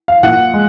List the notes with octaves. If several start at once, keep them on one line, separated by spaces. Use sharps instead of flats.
F5
A#2 F#5
G#3